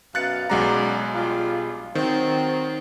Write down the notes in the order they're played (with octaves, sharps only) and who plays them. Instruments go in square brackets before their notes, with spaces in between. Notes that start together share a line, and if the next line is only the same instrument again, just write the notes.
[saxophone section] F#2 B2 F5 [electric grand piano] F#6 A6 C#7
[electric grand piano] B1 G#3 A#5 [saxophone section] C#4 D4 F#4
[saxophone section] G3 D4 F4
[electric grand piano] D#3 [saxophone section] F#3 C4